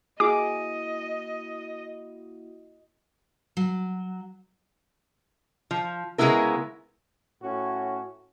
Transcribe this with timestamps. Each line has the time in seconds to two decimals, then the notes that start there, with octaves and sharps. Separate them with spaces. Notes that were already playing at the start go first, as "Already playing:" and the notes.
0.20 A#3 E4 F#4 G#4 D#5 D6
3.57 F#3
5.71 F3
6.18 C#3 G#3 A#3 B3 E4 A#4
7.42 A2 C#4 F#4